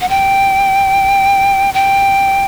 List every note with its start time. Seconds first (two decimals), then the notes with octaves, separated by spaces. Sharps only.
0.01 F#5
0.09 G5
1.74 G5